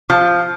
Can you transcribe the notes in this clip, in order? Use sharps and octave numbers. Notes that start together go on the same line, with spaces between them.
F3